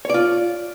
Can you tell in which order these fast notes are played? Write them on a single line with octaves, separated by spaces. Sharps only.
C#5 D5 F4